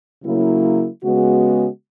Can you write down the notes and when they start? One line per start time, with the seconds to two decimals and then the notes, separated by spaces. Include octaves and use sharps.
0.24 C#3 F#3 A#3 E4
1.03 C#3 G#3 B3 F#4